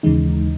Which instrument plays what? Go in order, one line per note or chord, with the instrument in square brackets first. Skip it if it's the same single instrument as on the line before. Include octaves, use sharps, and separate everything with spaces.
[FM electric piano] D#2 C#3 E3 G#3 D#4